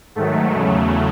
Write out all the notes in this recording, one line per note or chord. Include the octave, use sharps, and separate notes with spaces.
G#2 D#3 F#3 A3
E2 C#3 F#3